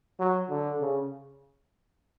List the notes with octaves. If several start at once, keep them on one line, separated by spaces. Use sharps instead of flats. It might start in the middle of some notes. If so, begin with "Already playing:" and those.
F#3
D3
C#3